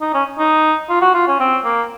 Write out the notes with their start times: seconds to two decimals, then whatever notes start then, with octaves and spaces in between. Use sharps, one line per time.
0.01 D#4
0.14 C#4
0.38 D#4
0.89 F4
1.01 F#4
1.14 F4
1.27 C#4
1.40 C4
1.65 A#3